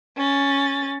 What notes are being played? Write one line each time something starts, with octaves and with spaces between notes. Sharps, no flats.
C#4 A6